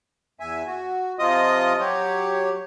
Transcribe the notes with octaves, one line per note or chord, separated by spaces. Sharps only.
E2 E5 G#5
F#4
C3 F3 F4 D#5 D#6
F#3 G4 C#5